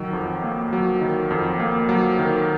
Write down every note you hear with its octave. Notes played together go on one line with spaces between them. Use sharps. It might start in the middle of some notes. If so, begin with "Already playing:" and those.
Already playing: D#3 F#3
F2
A#3
F#3
D#3
F2
A#3
F#3
D#3